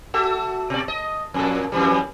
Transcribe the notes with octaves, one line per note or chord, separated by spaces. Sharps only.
F#4 A4 E5
B2 D5
D#5
F2 A#2 A4
F2 E3 G3